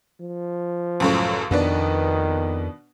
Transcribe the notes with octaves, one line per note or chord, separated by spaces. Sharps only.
F3
C#2 F#2 A2
F2 B2 D#3 B3 D4